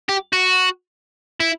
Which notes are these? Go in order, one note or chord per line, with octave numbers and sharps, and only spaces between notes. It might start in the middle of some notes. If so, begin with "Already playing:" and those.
G4
F#4
E4